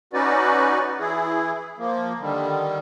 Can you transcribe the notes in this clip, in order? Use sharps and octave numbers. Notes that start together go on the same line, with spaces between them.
C#4 D#4 F#4 B4 D5
E3 E4 G#4
F3 A#3
D3 D#3 G3